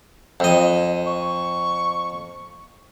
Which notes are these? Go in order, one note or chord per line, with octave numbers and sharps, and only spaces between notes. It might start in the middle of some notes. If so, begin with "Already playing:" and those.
F2 D#5
C#6